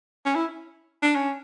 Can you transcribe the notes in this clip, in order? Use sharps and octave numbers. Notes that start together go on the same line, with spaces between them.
C#4
E4
D4
C#4